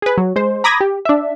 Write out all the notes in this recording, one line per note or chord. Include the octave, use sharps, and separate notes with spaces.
G#4 B4
F#3
G#3 C5
A#5 B5 D6 D#6 G#6 A#6
G4
D4 E5